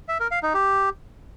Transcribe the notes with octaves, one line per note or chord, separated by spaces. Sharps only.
E5
A#4
F5
D#4
G4